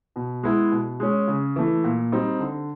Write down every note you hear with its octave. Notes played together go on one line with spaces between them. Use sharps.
B2
G#3 B3 E4
B2
G#3 C#4
C#3
E3 A3
A#2
G3 C4 D#4
D3